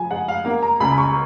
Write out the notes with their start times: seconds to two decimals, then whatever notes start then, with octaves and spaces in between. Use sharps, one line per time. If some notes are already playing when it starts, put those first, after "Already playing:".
Already playing: F3 G#5
0.11 G#3 F#5
0.28 F5
0.45 A#3 F5
0.63 A#5
0.80 C#2 B5
0.93 B5
0.98 C#6